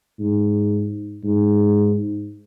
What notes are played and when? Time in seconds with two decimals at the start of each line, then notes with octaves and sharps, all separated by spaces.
0.19 G#2
1.24 G#2